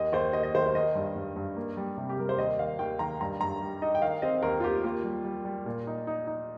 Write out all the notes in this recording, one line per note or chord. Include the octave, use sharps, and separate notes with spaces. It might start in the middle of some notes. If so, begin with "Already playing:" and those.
Already playing: D#2 D#5
D#2 C5
D#2 D#5
D#5
D#3 C5
C5
D#3 D#5
G2
G2
G2
A#3
G3
C3
G4
G3 A#4
C5
D#2 D#5
D#3 F5
D#2 G5
D#3 A#5
G2 A#5
G2 A#5
G3
D#4 D#5
G5
D#3 F5
C4 D#5
D#2 A#4
F4
D#2 G4
A#3 F4
G3
G3
G3
A#2
D#4
D#4
D#4